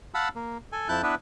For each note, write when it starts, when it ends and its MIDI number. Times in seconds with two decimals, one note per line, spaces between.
0.14 0.29 77
0.14 0.29 78
0.14 0.29 81
0.14 0.29 83
0.14 0.29 88
0.36 0.58 58
0.72 0.88 69
0.72 0.88 80
0.89 1.02 41
0.89 1.02 64
0.89 1.02 81
0.89 1.02 90
0.89 1.02 91
1.03 1.15 59
1.03 1.15 62
1.03 1.15 64
1.03 1.15 71